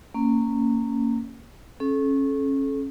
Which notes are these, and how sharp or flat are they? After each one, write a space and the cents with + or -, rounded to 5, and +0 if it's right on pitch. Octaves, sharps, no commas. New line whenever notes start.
A#3 -20 C#4 +0
C#4 -25 A4 -35